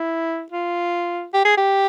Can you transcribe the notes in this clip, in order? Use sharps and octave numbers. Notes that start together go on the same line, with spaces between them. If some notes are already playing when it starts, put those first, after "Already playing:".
Already playing: E4
F4
G4
G#4
G4